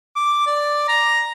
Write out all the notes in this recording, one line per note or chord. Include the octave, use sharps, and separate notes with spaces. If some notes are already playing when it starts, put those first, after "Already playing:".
D6
D5
A#5